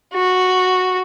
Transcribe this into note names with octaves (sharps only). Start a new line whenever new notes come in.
F#4